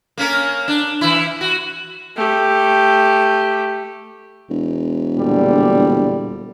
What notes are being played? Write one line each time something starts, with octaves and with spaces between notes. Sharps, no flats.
A#3 C#4 A#4
D4
E3 E4
F#4
A3 G4
E1
A#2 D3 G3